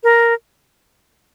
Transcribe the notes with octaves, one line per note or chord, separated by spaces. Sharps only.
A#4